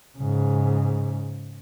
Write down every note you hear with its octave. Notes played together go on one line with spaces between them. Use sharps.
G#2 C#3